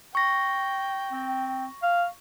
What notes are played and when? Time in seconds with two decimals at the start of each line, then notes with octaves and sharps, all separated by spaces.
0.15 G5 C#6 A#6
1.12 C4
1.83 F5